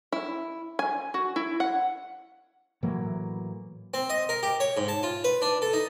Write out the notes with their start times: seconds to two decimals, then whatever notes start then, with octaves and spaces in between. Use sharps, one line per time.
0.12 E4
0.79 G#5
1.14 F#4
1.36 E4
1.60 F#5
2.83 A2 E3 F#3 A#3
3.94 C4
4.10 D#5
4.29 A#4
4.43 G4
4.60 C#5
4.77 G#2
4.88 A5
5.03 F4
5.24 B4
5.42 D4
5.62 A4
5.73 D#4